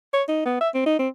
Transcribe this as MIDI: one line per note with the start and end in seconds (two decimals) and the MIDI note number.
0.14 0.23 73
0.28 0.45 63
0.46 0.56 59
0.61 0.69 76
0.74 0.83 60
0.86 0.98 63
0.99 1.08 60